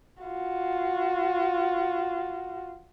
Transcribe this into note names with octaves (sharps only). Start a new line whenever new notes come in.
F4 F#4